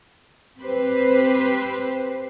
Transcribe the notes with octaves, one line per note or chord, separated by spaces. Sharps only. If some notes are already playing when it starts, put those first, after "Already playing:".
C4 G4 B4 C5